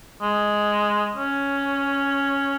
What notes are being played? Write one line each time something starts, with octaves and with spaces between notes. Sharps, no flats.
G#3
C#4